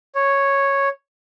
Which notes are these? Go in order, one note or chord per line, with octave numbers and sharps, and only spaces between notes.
C#5